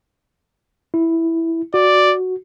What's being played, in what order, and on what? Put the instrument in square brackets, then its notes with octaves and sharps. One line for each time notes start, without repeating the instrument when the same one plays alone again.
[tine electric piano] E4
[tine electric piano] F#4 [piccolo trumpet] D5